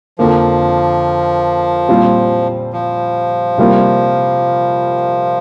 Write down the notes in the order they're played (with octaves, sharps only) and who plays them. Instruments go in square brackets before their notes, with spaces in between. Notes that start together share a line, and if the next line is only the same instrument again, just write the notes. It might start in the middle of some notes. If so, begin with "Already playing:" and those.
[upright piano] F2 D3 A#3 [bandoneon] F3
[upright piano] A#2 G3 C4 F4
[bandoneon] F3
[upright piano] C3 G3 A#3 F4